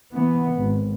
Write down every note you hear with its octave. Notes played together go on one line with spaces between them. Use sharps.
E3 B3
G#1